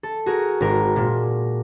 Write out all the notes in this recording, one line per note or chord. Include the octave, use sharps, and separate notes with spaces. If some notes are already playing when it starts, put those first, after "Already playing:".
A4
F#4 G#4 A#4
G#1 A#4
A#2